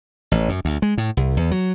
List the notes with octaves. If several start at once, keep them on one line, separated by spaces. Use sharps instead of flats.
A1
F#2
D2
G#3
A2
C2
E2
F#3